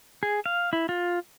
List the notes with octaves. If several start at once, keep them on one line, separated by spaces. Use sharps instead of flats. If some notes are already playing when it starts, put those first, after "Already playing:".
G#4
F5
E4
F4